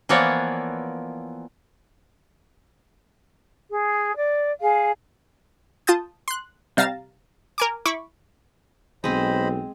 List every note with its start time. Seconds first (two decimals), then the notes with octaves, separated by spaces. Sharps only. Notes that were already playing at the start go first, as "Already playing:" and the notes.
0.09 E3 F3 A#3 B3 C#5 D5
3.69 G#4
4.15 D5
4.60 G#4 F5
5.87 F4 A5 D#6 G6
6.28 C6 F#6
6.77 C3 G3 F5 A#5 A6 E7
7.58 A#4 G#5 D6
7.86 E4 B5 C#6 D6
9.04 B1 G#3 C4 C5 D#5 B5